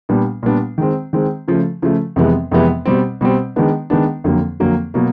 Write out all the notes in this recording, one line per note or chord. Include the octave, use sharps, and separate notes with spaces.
A#2 G3 B3 D4
A#2 G3 B3 D4
D#3 G#3 C4
D#3 G#3 C4
C#3 F3 A3
C#3 F3 A3
F2 C3 E3 G#3 B3
F2 C3 E3 G#3 B3
B2 G3 C4
B2 G3 C4
D#3 G#3 B3 D4
D#3 G#3 B3 D4
F2 D3 F#3 A#3
F2 D3 F#3 A#3
B2 F#3 A#3